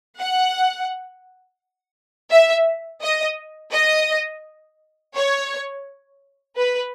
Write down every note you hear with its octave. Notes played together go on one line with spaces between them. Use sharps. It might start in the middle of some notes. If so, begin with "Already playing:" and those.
F#5
E5
D#5
D#5
C#5
B4